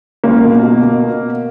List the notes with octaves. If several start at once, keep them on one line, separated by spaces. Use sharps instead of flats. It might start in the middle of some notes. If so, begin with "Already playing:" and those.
C#2 A#3
B2
B2
B2